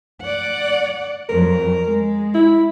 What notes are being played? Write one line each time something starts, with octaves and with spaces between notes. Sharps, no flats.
D5 F#5
F2 F#3 A#4
G#3
E4